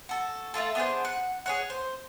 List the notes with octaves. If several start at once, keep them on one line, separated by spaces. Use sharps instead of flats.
F#4 A4
A3 C4 F4 A4
B3 D4 G#4 C5
F#5
G#4 C#5 F#5
C5